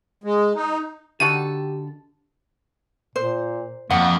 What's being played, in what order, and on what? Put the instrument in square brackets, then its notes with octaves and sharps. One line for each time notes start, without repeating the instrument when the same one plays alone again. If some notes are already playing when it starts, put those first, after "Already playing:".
[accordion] G#3
D#4
[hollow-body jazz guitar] D3 [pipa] D#3 F#4 A4 [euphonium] G4 [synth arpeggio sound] D#7
[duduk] A#2 [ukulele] C5
[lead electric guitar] F2 [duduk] A#3 [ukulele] F#5